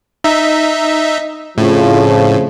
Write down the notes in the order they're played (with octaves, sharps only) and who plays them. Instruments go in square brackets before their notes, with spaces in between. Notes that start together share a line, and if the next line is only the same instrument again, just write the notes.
[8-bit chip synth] D#4 E5
[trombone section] F2 C#3 F3 [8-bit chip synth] A2